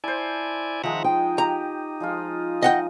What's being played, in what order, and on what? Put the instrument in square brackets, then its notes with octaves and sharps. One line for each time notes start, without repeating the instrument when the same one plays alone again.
[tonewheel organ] E4 D5 G#5 [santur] C5 A5
[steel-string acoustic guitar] D#3 [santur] F3 G#3 [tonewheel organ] E5 F#5 A#5
[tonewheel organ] D#4 [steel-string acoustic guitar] G5
[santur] G4 [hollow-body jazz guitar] A#5
[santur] F3 G#3 F4
[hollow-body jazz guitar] D#5 F#5 G5